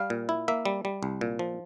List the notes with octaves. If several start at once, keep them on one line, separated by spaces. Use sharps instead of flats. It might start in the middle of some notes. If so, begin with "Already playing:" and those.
Already playing: G3 F5
A#2
E4
A#3 E5
G3
G3
C2
A#2
F3